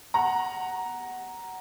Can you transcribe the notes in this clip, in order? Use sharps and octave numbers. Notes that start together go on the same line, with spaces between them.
F#5 A#5